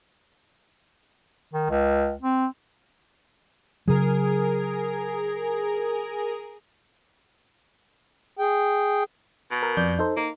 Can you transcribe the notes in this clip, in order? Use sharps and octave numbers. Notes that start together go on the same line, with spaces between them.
D#3
C#2
C4
C#3 F#3 G#4 A#4
G#4 G5
B2
A#4
F2 D5 G6
D#4 A4 C5
A#3 D#4